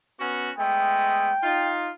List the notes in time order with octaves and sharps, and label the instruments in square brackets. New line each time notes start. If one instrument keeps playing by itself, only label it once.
[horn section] B3 C#4 F#4
[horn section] G#3 A3 B3 [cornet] G5
[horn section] D#4 F4